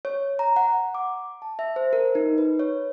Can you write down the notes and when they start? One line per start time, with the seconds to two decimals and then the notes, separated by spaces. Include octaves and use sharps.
0.05 C#5
0.39 A#5
0.56 F#5
0.95 D6
1.42 A5
1.59 E5
1.76 C5
1.93 A#4
2.15 D#4
2.38 B4
2.59 C#5